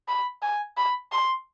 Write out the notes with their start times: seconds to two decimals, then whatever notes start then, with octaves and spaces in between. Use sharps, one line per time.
0.08 B5
0.42 G#5
0.77 B5
1.12 C6